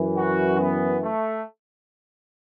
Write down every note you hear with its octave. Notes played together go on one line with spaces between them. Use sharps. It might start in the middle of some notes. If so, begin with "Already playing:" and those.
Already playing: F#2 E3
F#4
B3
A3